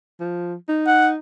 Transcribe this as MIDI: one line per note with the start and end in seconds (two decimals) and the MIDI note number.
0.20 0.54 53
0.69 1.17 63
0.87 1.09 78